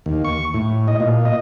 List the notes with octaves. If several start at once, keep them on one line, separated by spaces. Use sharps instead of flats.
D#2
C#6
A2
D#5
A#2
D#5